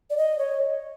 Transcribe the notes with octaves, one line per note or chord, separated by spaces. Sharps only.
D5
D#5
C#5